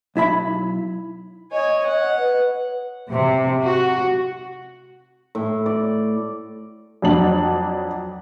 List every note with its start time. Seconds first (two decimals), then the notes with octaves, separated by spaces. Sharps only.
0.16 B1 E4 E5 B5
1.52 C#5 D#5 G#5
1.86 F#5
2.17 B4
3.11 C3
3.62 F#4
5.35 A2
5.66 D5
7.02 F2 F#3 D4 F#7